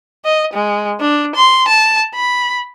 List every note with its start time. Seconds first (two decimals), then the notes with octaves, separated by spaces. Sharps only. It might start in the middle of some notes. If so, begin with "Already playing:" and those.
0.25 D#5
0.54 G#3
1.00 D4
1.35 C6
1.68 A5
2.14 B5